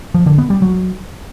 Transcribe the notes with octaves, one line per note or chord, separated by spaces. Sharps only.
F3
D3
B3
G3
F#3